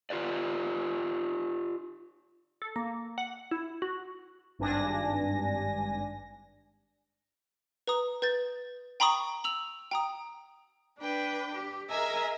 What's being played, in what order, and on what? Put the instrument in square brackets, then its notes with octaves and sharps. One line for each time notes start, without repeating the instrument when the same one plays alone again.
[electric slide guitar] F4 G4 B4 D5
[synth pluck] A4
A#3
F#5
E4
F#4
[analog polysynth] G#1 G2 D4 G#5 A#6
[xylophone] B4 A#5 D#6
B4 G6 A6
G5 A#5 B5 C#6 D#6
E6 F7 F#7
G5 A#5 D#6
[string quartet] D4 B4 G5
G4
G#4 A#4 D#5 E5 G#5 A#5